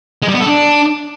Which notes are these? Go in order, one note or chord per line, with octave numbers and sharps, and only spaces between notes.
G#3
G3
B3
A4
D4